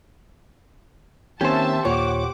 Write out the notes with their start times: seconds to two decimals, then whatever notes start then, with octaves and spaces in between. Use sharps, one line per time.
1.41 D#3 A#3 C4 C#4 G4 C5 E5 A5
1.85 D#2 A#2 C#5 F#5 D6